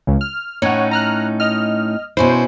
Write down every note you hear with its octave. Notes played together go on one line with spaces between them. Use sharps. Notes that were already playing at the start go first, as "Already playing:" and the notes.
C#2 C#3
F6
A2 C#4 D#4 C#5 F#5
A#5 F6 F#6
D#5 F6
B2 C#4 E4 C5